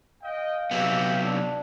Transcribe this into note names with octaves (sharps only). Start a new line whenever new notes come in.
D#5 F5 G5
C3 F#3 B3 G4 E5
D4